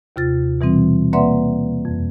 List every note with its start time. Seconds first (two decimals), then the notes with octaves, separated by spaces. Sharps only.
0.16 D#2 C3 F4 A6
0.61 B2 E3 G3 C4
1.13 A#3 B4 D5 E5 F#5 C6
1.85 F2